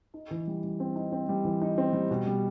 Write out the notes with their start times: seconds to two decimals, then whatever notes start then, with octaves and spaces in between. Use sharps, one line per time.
0.14 D#4
0.31 E3
0.47 G3
0.64 G3
0.80 C4
0.96 D#4
1.12 C4
1.29 G3
1.44 E3
1.62 D#4
1.78 C4
1.93 G3
2.10 B2
2.26 G3